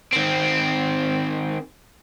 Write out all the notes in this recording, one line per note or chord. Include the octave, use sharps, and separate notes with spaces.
D#3 C4